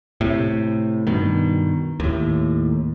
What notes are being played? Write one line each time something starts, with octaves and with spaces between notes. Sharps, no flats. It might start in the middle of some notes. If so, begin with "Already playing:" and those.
A2 C3
G2 B2 D#3
D#2 A2